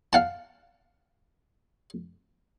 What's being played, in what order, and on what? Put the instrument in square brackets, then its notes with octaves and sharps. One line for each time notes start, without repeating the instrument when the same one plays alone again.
[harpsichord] F5 F#5 A5